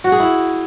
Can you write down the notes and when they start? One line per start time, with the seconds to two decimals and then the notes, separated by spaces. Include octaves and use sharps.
0.04 F#4
0.12 G#4
0.20 E4